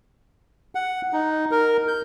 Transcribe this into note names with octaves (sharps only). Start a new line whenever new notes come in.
F#5
D#4
A#4
G6